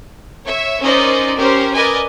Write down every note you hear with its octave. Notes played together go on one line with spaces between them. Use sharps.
C#5 E5
C#4 D#4 A#4 C5 D5 D#5
C#4 G4 A#4 C5
A#4 B4 D5 D#5 G#5